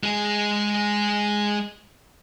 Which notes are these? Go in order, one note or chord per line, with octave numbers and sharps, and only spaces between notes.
G#3 G#4